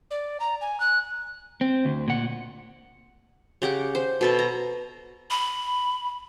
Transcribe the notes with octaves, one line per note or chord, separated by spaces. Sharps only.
D5
A#5
G#5
F#6
C4
D2
A#2 F#5
C#3 G4 F#5 D6
C5
B2 A4 B4
A#5
B5